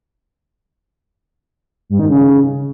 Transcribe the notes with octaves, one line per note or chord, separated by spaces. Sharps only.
G2
D#3
C#3